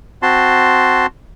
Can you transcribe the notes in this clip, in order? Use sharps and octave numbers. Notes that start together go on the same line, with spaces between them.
C4 F#4 A5 C6